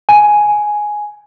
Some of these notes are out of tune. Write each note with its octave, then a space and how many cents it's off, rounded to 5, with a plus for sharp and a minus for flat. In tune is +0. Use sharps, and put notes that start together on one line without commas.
G#5 +5